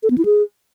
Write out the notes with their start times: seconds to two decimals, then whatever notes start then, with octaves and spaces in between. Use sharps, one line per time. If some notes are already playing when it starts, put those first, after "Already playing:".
0.03 A4
0.10 B3
0.18 E4
0.25 G#4